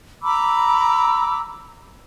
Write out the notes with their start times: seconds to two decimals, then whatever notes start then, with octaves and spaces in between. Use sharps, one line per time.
0.22 A#5 B5 D6 E6